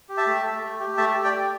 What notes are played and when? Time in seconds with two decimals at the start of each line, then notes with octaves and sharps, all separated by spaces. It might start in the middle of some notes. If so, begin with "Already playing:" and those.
0.09 G4
0.17 E5 A5
0.27 A3
0.44 A3
0.63 A3
0.80 G4
0.97 A3 E5 A5
1.15 G4
1.24 D5 G5
1.33 G4